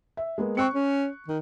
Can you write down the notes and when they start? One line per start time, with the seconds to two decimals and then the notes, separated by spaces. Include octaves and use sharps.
0.17 E5
0.38 G#3 A#3 B3
0.57 C4 C#6 F#6 C#7
0.74 C#4
1.28 D#3